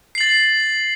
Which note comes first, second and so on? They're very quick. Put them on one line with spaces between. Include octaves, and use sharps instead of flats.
C7 F#7 A6